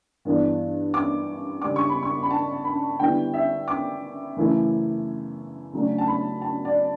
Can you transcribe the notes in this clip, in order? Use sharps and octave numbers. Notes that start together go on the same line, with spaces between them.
G2 E3 B3 D4
D6
C#3 G3 D4 D6
C#6
B5
C#6
B5
A5
B5
D3 G3 B3 E4 G5
E5
D6
F#2 C#3 E3 A3 E4
C#3 F#3 A3 D4
A5
B5
A5
D5